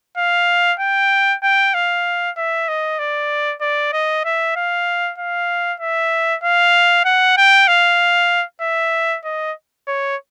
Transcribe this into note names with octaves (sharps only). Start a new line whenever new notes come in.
F5
G5
G5
F5
E5
D#5
D5
D5
D#5
E5
F5
F5
E5
F5
F#5
G5
F5
E5
D#5
C#5